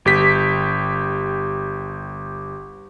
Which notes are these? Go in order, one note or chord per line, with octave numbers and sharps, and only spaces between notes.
G1 G4 B6